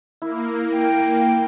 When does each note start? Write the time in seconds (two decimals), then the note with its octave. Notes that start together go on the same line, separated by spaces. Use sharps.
0.22 A#3 E4
0.76 G5